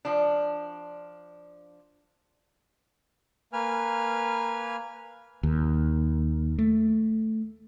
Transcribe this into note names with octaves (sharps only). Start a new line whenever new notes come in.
F3 D4
A#3 B4 G#5 F6
D#2
A3